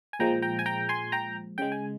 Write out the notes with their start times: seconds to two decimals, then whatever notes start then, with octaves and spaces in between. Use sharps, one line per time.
0.13 G#5
0.19 A#2 F3 G#3 G5 A#5
0.42 G5 A#5
0.59 G#5
0.66 G5 A#5
0.89 G#5 C6
1.12 G5 A#5
1.58 C#3 G#3 G5
1.72 G#5